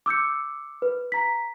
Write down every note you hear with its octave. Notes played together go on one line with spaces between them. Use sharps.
D6 E6 G6 C#7
B4
A#5 B6